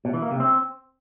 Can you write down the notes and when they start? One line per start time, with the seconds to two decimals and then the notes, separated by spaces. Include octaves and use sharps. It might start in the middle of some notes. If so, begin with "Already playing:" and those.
0.05 B2
0.14 E3
0.22 A#3
0.31 C3
0.40 C4